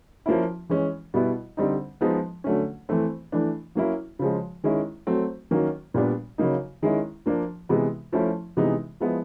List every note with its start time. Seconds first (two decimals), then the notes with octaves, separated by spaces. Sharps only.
0.26 F3 A#3 C#4 E4
0.69 E3 G#3 C#4
1.14 B2 G3 B3 E4
1.57 D3 G3 C4 D#4
2.01 F3 G#3 B3 D#4
2.44 D3 F#3 A3 C#4
2.89 E3 A3 C4
3.32 E3 A3 D4
3.75 F#3 A#3 C#4 E4
4.19 C#3 F3 G#3
4.64 D#3 G#3 C#4 E4
5.07 F#3 A3 C4
5.51 D#3 F#3 A#3 C#4
5.94 A#2 G3 B3 D4
6.38 C#3 F#3 A#3 D#4
6.82 D#3 G#3 C#4 E4
7.26 F3 A#3 D4
7.69 C3 E3 G#3 B3
8.12 F3 A3 C#4 E4
8.57 C3 E3 G#3 B3 D#4
9.00 F3 G#3 B3 E4